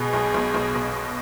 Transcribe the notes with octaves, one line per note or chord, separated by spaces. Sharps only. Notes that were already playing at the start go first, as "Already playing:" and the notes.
Already playing: B2 G#4
B1
B1
B1
B2